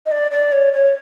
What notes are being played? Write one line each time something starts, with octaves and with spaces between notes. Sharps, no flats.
D#5
D5
D5
C#5
C#5